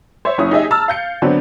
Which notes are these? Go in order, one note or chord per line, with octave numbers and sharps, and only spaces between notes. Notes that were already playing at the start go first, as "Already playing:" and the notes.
C5 C#5 E5
F#1 C#4 E4 D#6
D#4 G4 G#4 D#5 E5
A5 A#5 E6 F6 A6
F5 G6 C#7
D3 F#3 B3 C4 D4